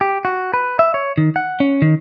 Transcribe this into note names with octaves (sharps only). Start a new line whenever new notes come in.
G4
F#4
B4
E5
C#5
D#3
F#5
C#4
D#3